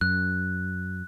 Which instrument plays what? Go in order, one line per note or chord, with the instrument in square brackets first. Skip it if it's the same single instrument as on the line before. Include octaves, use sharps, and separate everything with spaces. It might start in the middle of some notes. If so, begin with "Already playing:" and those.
[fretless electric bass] F#2 [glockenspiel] F#6